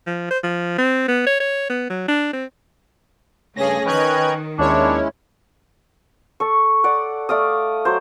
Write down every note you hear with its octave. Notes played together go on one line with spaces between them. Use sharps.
F3
C5
F3
C4
B3
C#5
C#5
B3
F#3
D4
C4
G2 C#3 A3 C#4 G#4 A#6
D#3 C#4 B4 D#5 G5 A#5 F#6 G#6
D#2 G#3 C#4 D4 E4 C#5
A4 C#6
D5 F#5
A3 D5 F5 D#6
F#3 C5